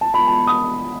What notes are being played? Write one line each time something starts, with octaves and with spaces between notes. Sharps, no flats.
A5
B5
A5
D#6